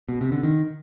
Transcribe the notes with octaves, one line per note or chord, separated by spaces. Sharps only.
B2
C3
D3
D#3